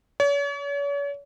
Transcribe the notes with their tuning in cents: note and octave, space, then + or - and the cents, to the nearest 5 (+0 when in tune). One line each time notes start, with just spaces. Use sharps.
C#5 +40